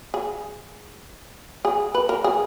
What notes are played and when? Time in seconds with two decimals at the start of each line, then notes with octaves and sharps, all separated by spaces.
0.14 G#4
1.65 G#4
1.94 B4
2.09 A#4
2.24 G#4